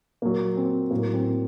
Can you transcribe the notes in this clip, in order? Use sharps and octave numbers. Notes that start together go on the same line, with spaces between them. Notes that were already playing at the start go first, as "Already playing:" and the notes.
A#2 F#3 A#3
C4
A2 F#3 A#3
C4